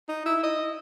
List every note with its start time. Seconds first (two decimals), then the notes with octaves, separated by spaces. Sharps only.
0.08 D#4
0.26 E4
0.43 D#5